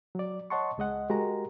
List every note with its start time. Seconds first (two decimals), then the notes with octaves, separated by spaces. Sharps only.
0.15 F#3 D5
0.50 C#5 D#5 F#5 A5 C6 C#6
0.78 C#2 G#3 D#5 F#5
1.10 G#3 F#4 G4 A#4 A#5